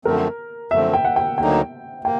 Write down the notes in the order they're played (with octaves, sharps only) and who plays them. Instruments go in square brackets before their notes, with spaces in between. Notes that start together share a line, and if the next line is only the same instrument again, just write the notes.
[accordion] F#2 D3 F3 A3 C4 [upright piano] A#4
[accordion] F#2 D3 F3 A3 C4 [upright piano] E5
[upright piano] G5
F#5
G5
[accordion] D2 D3 F#3 A#3 D#4 [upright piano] G5
[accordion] A#3 [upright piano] G5